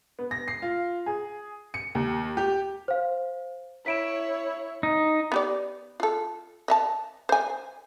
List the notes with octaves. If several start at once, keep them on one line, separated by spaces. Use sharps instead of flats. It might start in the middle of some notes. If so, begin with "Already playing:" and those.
B3
A#6
C7
F4
G#4
C#7
D#2
G4
C5 F5
E4 C#5 B6 D7 E7
D#4
B3 G4 D5
F4 A4
D#5 E5 A5
C5 G#5